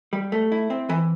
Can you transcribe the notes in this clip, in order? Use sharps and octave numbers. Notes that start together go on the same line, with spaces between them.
G3
A3
E4
C4
E3